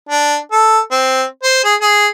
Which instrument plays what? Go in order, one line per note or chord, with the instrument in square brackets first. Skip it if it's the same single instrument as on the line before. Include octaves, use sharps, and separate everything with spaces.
[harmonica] D4
A4
C4
C5
G#4
G#4